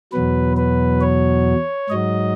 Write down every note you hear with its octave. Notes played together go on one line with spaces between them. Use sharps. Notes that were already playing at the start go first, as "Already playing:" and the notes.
E2 B2 F#3 B4
B4
C#5
G#2 F#3 D#5